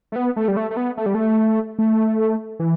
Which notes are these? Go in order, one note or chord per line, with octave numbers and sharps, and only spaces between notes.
A3
B3
A3
G3
A3
A3
B3
A3
G3
A3
A3
E3